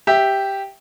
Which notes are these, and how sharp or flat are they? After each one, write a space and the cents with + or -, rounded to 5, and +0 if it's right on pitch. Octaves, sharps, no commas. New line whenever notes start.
G4 +0 E5 +0